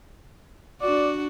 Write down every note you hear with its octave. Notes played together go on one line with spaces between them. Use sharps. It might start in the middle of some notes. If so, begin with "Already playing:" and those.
D4 F#4 D5